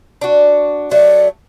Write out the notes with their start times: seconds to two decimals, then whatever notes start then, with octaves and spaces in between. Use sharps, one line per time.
0.21 D4 F#4
0.91 F#3 A3 D5